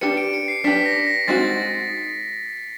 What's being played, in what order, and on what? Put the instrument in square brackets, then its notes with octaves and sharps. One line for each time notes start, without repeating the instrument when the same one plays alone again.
[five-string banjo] D4 G4 B4 [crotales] C#7
[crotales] D7
C#7
C7
[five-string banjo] D4 G4 B4 [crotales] B6
[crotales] A#6
A#6
[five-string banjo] G#3 C4 D#4 F#4 [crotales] A6